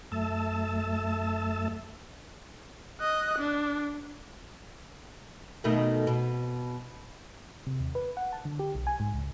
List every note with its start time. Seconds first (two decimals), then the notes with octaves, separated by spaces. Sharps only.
0.12 F#2 A3 E5 A5 E6
3.01 D#5 F#6
3.39 D4
5.64 B2 D#3 A3
6.07 B2
7.67 C3
7.80 D#2
7.95 B4
8.17 F#5
8.33 A5
8.45 D3
8.59 G4
8.75 B1
8.87 G#5
9.00 G#2
9.14 C#2